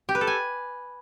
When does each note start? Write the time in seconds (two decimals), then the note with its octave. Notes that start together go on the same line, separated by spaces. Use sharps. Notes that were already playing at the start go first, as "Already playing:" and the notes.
0.09 G4
0.15 B4
0.21 A4
0.27 G#5